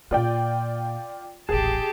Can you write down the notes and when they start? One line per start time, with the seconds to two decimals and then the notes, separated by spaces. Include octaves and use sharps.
0.11 A#2 A#3 F4 D5 G5
1.49 D#1 A1 G4 G#4 A5